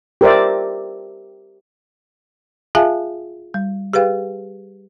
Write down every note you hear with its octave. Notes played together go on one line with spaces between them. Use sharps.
G4 A#4 C5 D5 E5
F4 G#4 E5 F5 G#5 A5
G3
G4 G#4 B4 F5 G5